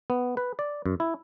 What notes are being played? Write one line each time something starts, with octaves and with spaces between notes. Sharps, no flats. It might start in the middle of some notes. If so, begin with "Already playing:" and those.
B3
B4
D5
F#2
E4